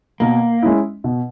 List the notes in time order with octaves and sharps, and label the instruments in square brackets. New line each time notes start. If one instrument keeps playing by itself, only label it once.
[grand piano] B2 [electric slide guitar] A#3
[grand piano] G#3 C#4 E4
B2